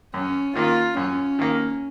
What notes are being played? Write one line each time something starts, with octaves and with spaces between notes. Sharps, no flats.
F#2 C#4
D#3 A#3 F4
F#2 C#4
D#3 A#3